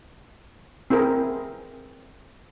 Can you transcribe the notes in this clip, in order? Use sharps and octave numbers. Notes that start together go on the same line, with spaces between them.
C4 E4 G#4 A#4